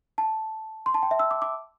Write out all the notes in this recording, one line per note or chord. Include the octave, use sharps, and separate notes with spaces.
A5
C6
A5
G5
E5
E6
D6
D6